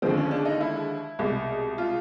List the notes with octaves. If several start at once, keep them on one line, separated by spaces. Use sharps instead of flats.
D#2 D3 F3 G#3 C4
C#4
D4
D#4
E4
C2 B2 G#3
F4